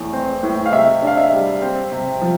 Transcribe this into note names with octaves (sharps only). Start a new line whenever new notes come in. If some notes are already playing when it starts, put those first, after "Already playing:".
Already playing: E2 A2
C4
A2
F5
C3 E5
D4 F5
E5
G3
C4
C3
F3